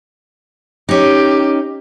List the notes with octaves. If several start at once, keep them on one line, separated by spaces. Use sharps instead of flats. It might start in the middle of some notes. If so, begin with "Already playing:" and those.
C#4 D#4 G4